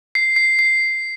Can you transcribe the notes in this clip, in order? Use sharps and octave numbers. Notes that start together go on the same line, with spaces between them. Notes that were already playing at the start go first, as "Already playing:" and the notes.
C7
C7
C7